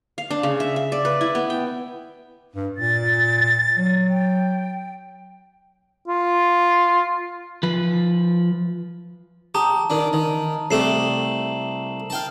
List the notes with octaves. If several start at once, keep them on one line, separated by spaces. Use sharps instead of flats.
F5
D4
C#3
E5
E5
D5
B4
E4
B3
G5
G2
A#2 A6
F#3
G5
F4
F3 B4
G4 A5 A#5 D#6
D#3 D4
D#3
C2 A3 G4 C7 E7 F#7
F5 G5 A5